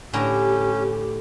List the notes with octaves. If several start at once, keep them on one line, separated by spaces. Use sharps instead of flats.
A2 D3 C#4 G4 A#5